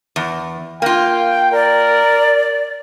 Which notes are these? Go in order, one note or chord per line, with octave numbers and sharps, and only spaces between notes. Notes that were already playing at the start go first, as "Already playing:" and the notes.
E2
A#3 F4 G5
A#4 D5